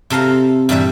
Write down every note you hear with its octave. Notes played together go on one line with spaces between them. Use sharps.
C3 A4 F5 A#5
G2 A#2 E3 G3 E5